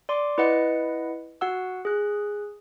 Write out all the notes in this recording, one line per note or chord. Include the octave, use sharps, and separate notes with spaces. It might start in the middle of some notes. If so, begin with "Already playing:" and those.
D5 C6 D6
E4 B4 D#5 F#5 C#7
F#4 F#5 E6
G#4 F#6